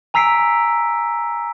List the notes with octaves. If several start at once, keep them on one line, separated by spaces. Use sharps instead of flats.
G#5 A#5 E6 B6 C7 D7